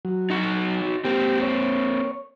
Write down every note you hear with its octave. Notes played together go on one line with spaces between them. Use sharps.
F#3
D#4 F#4
A#3 C4 G4
C#5